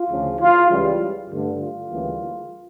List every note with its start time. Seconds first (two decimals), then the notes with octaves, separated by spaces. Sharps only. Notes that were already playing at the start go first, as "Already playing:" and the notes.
Already playing: F4
0.10 D2 C#3 F3
0.40 F4
0.70 C#2 C#3 E3 G3
1.30 G2 D3 A3
1.59 F4
1.89 D2 C#3 E3 G3 A#3